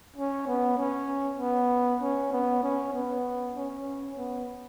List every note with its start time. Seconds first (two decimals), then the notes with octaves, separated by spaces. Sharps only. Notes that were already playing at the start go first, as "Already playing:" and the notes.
0.17 C#4
0.47 B3
0.78 C#4
1.40 B3
2.01 C#4
2.32 B3
2.63 C#4
2.94 B3
3.56 C#4
4.17 B3